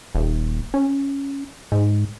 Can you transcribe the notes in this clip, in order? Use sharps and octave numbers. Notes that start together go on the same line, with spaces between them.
D#1
C#4
G#2